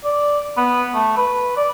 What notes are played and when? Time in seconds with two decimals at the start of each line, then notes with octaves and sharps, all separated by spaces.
0.04 D5
0.57 B3
0.95 A3
1.17 B4
1.57 D5